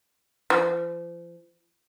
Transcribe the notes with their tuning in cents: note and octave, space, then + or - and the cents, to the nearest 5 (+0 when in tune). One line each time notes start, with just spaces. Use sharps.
F3 -35